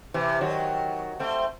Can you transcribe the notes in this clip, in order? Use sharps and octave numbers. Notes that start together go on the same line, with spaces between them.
C3 E3
D#3 F#3
A3 C4